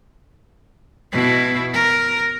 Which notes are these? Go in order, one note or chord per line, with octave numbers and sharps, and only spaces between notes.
B2 E4
A#4